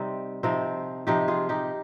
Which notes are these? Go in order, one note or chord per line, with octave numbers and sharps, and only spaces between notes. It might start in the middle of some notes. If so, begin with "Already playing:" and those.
Already playing: C3 G3 C4 D#4
C3 F3 C4 D#4
C3 F3 D#4 G4
F4 G#4
D#4 G4